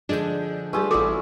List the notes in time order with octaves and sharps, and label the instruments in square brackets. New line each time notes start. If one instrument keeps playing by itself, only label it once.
[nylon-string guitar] D3 F3 G#3 [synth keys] D4 G6
[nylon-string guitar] G3 G4 B4 [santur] A3 F4 G#4
[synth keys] A1 F#4 [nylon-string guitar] E3 C4 E4 [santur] D4 [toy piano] A4 D6